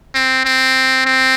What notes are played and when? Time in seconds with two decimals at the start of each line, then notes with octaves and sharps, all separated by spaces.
0.15 C4
0.45 C4
1.06 C4